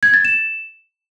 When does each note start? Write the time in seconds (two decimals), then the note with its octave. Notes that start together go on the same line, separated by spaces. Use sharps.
0.03 G#6
0.14 A6
0.25 E7